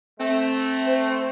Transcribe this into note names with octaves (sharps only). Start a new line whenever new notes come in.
A3 C4
C5